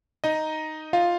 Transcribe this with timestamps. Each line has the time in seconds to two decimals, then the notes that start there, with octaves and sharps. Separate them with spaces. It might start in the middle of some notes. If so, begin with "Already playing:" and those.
0.24 D#4 D#5
0.93 F4 F5